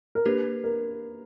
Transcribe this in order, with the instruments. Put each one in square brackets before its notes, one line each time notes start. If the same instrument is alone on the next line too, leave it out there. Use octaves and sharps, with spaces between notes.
[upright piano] A#4
[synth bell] A#3 D4 G4 [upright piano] B4
[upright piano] A#4